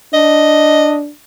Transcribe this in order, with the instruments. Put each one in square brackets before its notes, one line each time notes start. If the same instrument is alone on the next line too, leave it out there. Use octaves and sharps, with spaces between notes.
[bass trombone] D4 [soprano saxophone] D#5